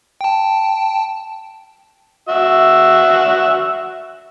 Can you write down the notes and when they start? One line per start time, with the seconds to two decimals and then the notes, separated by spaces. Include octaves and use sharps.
0.21 G5 A5
2.29 F#4 E5